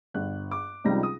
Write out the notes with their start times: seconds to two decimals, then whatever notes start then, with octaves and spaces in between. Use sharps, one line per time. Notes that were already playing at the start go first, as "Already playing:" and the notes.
0.14 G1 F#6
0.51 D6
0.84 C#2 C3 F3 G3 D#4 A#6
1.03 D#6